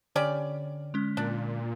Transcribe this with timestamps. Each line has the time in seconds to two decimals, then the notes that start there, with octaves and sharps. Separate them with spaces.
0.16 D3 C#4 G4 D5
0.94 G#3 C#4
1.17 A#2 D4